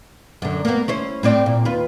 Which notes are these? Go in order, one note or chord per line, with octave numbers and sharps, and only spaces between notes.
F#2 D3
A#3 B3
C#4 E4 C5
A2 C4 D5
A#2
D#2 F4 B4